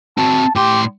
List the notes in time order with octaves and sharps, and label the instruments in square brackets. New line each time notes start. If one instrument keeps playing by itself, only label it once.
[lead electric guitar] C4 F#4 [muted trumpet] A5
[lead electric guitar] A2 C6 [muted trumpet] G4